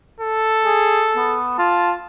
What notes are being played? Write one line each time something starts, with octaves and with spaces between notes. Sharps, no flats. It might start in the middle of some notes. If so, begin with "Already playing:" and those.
A4
G#4
B3
F4 A5